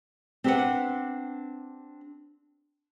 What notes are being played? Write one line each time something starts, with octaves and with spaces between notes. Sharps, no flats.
C4 D4 G4 A#4 B4 F#5